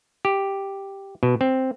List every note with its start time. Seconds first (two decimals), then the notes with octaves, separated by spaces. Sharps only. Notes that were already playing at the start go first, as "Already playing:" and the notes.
0.25 G4
1.23 B2
1.41 C4